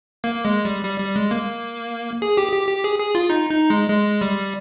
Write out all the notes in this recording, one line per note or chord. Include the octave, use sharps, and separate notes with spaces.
A#3
G#3
G3
G3
G3
G#3
A#3
G#4
G4
G4
G4
G#4
G#4
F4
D#4
D#4
G#3
G#3
G3